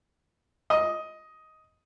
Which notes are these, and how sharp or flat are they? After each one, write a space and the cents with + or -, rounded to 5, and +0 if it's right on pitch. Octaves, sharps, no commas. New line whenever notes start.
D#5 +10